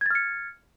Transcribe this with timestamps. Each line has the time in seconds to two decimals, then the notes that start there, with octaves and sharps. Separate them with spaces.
0.01 G#6
0.06 A6
0.11 F6
0.15 C#7